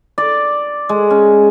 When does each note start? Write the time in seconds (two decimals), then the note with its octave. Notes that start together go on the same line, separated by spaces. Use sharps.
0.18 D5
0.89 G#3
1.10 C#4